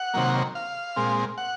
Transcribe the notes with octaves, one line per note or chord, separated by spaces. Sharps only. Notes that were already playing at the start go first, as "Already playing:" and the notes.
Already playing: F#5
C3 D#3 F#3 A#3
F5
A#2 G#3 C4
F#5